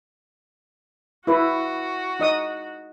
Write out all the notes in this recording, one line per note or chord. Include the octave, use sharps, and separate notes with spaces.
E4 F#4 B4
D#4 D#5 D#6